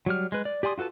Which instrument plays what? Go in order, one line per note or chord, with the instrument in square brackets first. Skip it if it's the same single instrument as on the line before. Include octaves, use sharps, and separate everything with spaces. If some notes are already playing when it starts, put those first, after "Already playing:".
[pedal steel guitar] F#3 G3 F6
G#3 B4
D5
G4 D5 G#5 C6 D#6
F4 F#4 A4 B4 A5